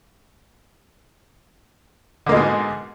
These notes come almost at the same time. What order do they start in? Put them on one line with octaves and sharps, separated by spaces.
D3 A#3 G#3 B2 G#2